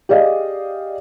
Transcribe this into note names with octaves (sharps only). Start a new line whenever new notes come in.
G4 G#4 D5 D#5 F5